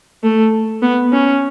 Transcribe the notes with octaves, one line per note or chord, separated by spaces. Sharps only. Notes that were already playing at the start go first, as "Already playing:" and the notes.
A3
B3
C#4